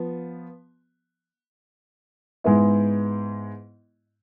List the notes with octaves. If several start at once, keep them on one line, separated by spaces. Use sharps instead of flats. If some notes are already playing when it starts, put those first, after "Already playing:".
Already playing: F3 B3
G#2 G#3 B3 E4